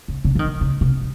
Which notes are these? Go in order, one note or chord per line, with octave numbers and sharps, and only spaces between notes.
C#3
C#3
F3
D#3
C#3
C3